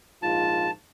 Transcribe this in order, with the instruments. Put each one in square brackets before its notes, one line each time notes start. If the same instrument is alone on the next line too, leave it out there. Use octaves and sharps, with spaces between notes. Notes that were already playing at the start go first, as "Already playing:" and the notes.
[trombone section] A#1 G#2 F4 [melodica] A5